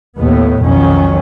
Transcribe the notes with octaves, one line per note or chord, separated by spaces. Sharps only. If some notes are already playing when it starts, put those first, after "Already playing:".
D#2 A2 B3
B1 F2 D#3 F#3 C#4